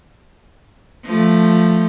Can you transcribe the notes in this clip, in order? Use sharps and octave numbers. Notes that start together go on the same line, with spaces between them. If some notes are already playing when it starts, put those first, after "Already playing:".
F3 A3